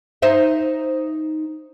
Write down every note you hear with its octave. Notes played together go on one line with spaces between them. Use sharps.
D#4 C5 E5